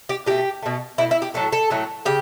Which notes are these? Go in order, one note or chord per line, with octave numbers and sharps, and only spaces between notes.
G4
B2 A3 G4
B2 A3
B2 A3 E4
E4
G4
A2 F#3 A3 A4
A4
A2 F#3 A3
C#3 G4